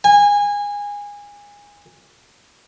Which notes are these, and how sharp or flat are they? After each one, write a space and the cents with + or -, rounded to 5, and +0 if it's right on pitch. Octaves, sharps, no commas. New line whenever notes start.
G#5 -20